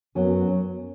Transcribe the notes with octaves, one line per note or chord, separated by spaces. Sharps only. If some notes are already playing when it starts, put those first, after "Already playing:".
F#2 F#3 B3 G#5